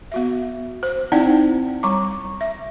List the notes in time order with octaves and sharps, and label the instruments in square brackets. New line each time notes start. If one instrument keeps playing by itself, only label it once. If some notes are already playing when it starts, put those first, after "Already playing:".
[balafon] B3 F#4 E5
C5
C4 D#4 E4 D5 G5
G3 A#5 D6
E5